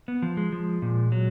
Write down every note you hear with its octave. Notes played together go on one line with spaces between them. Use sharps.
B3
F3
G#3
F3
A#2
F#3